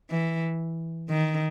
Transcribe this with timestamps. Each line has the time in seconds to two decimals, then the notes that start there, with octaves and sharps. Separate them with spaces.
0.10 E3
1.10 D#3